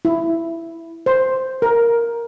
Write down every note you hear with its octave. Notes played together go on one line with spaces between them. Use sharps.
E4
C5
A#4